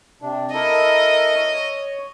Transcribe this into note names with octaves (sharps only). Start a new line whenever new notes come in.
C3 D4
E4 A4 A#4 D#5
C#5